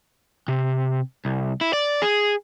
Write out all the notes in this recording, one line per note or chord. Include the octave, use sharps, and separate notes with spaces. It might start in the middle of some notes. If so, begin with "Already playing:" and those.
C3
C2
E4
D5
G#4